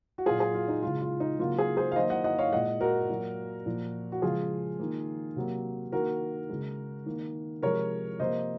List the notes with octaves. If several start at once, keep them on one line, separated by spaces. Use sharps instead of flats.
F#4
A#2 F#3 A#3 F4 G#4
F4 G#4
F4
D#4
C#3 G#3 F4
F4
D#4
C#3 F#3 A#3 F4
F4 G#4
G#4 C5
F5
D#3 F#3 A#3 C5 D#5
D#5 F#5
D#5 F#5
C#5 F5
A#2 G#3 D#5 F#5
F#4 A#4
A#2 F#3 A#3
A#2 F3 A#3
F#4
C#3 F3 G#3 F4 G#4
D#3 A#3
C3 F#3 A#3
D#3 A#3 F#4 A#4
C#3 G#3
D#3 A#3
C3 F3 G#3 A#4 C#5
C3 F3 A#3 C5 D#5